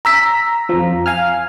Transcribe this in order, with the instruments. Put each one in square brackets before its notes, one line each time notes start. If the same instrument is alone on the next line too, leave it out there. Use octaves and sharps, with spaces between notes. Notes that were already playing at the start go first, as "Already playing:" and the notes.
[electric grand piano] A#5 E6 B6
[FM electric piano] F2 F3
F5 G#5 F6